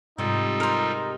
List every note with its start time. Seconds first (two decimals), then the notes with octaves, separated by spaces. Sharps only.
0.18 G#2 C3 G3 D#4 F4 A4
0.60 A#4 C5